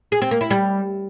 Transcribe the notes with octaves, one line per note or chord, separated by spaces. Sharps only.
G#4
C4
A#3
E4
G3